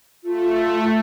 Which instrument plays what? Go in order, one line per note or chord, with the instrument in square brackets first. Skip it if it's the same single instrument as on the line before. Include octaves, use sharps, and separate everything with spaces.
[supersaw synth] A3 [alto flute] F4